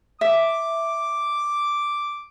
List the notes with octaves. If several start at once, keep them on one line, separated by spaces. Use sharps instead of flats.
E5 D6